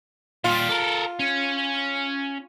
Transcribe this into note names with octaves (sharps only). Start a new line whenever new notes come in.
A#2 G3 F4
A4 A#4
C#4